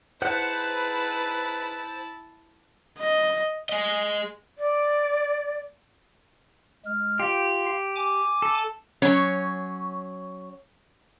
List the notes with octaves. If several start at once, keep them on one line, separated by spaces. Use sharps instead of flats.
D#4 E4 G#4 B4 C5 F#5 A5 F#6
D#5
G#4 D#5
D5
G#3 F6
F4 G4 F5
G#5 D6
A4
F#3 C#4 C#5